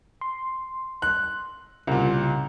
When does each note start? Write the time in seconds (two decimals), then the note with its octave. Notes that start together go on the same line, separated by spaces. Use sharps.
0.21 C6
1.02 F#6
1.87 C2 A#2 C#3